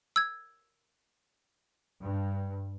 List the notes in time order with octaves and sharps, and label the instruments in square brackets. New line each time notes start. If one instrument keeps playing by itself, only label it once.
[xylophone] E6 G#6
[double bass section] G2